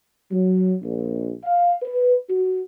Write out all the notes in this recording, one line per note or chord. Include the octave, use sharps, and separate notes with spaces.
F#3
A#1
F5
B4
F#4